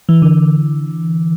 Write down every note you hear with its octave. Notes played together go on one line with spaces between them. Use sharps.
E3
D3